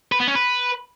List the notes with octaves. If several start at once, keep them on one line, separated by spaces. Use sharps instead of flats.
B4
B3
C#4
B4